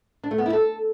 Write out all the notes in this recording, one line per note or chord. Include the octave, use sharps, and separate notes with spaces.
D4
A3
B3
E4
A4